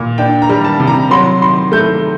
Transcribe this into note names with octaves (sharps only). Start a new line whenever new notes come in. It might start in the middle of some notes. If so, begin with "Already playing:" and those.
Already playing: A#2
D4 G5
A#5
G3
A5
C3
A#5
F#3 C6
D#3 C6
A3 G6